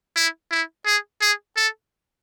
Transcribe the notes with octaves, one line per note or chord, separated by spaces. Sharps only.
E4
E4
G#4
G#4
A4